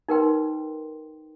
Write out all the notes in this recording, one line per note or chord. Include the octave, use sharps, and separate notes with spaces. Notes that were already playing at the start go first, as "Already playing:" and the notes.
D#4 A#4 B4 G5 C6